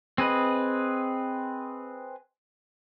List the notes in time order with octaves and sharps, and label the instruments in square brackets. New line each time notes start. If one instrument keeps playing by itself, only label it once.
[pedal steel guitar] C4 G#4 B4 D#5